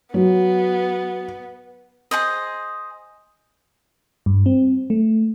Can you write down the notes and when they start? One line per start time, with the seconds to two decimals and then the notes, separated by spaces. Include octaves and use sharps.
0.14 F#3 B3
2.11 G#4 C5 D#5
4.26 G2
4.46 C4
4.90 A3